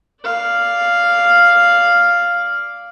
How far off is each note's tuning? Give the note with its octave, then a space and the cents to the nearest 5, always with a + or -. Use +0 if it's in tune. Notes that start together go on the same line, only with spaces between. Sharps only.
D5 -5 F5 +0